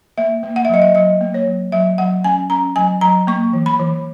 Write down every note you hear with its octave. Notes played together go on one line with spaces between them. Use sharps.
A#3 E5
A#3
F#5
E5
F#3 D#5
E5
F#3 D#5
A#3
C#5
F#3
F#3 E5
F#3 F#5
C#4 G#5
C#4 A#5
F#3 G#5
F#3 A#5
A#3 C#6
E3
B5
E3